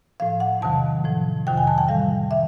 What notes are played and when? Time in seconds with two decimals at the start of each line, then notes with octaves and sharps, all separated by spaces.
0.20 A2 F3 F5
0.40 F#5
0.61 E2 C3 D#3 F#3 A5
1.04 A2 F3
1.47 F2 C3 D#3 F#3 G5
1.58 G#5
1.67 A5
1.78 G5
1.89 A2 E3 G3 F5
2.31 D#3 E5